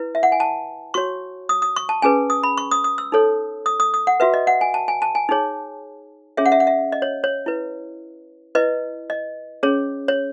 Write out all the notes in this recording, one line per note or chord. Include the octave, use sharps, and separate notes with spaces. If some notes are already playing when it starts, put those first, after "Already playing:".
Already playing: E4 B4
E5
F#5
G#5
A5
F#4 C#5 C#6
D#6
D#6
C#6
A5
C#4 G#4 B4 G#5
D#6
B5
C#6
D#6
D#6
E6
D#4 A4 C#5
D#6
D#6
D#6
F#5
F#4 B4 E5
D#5
F#5
G#5
A5
G#5
A5
G#5
D#4 G#4 C#5
C#4 G#4 C#5 E5
F#5
E5
F#5
E5
D#5
C#5
C#5
E4 B4
E4 B4 D#5
D#5
C#4 G#4 C#5
C#5